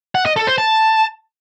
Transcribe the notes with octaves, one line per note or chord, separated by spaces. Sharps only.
F#5
D#5
A4
C5
A5